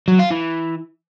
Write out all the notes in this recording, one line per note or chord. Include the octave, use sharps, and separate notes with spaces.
F#3
F4
E3